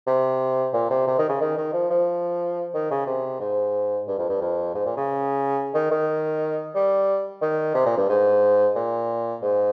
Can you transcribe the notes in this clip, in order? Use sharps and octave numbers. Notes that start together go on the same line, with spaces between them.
C3
A#2
C3
C3
D#3
C#3
D#3
D#3
F3
F3
D#3
C#3
C3
G#2
G2
F2
G2
F2
G#2
A#2
C#3
D#3
D#3
G3
D#3
C3
A#2
G2
G#2
A#2
G#2